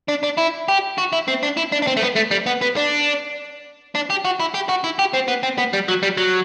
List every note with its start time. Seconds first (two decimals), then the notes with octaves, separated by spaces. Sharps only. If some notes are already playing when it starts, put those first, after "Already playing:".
0.09 D4
0.24 D4
0.38 E4
0.68 G4
0.98 F#4
1.13 E4
1.28 C4
1.43 D4
1.57 E4
1.72 D4
1.82 D4
1.87 C4
1.97 A3
2.02 B3
2.16 A3
2.31 G3
2.46 B3
2.61 B3
2.76 D4
3.95 D4
4.10 G4
4.25 F#4
4.40 E4
4.54 G4
4.69 F#4
4.84 E4
4.99 G4
5.14 C4
5.28 B3
5.43 C4
5.58 B3
5.73 G3
5.88 F#3
6.03 G3
6.17 F#3